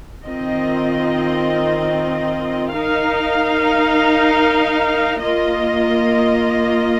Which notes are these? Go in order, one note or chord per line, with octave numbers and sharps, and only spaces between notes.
D#3 C4 F4 D#5
D#4 A#4 F5
A#3 F4 D#5